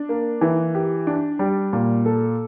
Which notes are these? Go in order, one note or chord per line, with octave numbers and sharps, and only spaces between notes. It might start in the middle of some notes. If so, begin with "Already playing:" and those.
Already playing: D4
A#3
E3
G4
D4
G3
A#2
A4